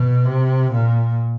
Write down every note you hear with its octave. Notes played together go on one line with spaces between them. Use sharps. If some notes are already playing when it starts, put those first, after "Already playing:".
Already playing: B2
C3
A#2